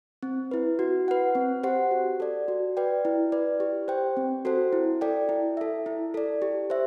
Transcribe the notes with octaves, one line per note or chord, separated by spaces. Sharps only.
C4
E4 B4
F#4
B4 F#5
C4
G4 C5 F#5
F#4
A4 D5
F#4
B4 D5 G5
E4
B4 D5
G4
C5 G5
C4
F#4 A4 C5
E4
A4 D5 G5
E4
A4 E5
E4
A4 D5
G4
C5 E5